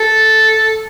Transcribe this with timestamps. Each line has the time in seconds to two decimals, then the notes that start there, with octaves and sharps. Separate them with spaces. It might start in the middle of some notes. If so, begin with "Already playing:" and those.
Already playing: A4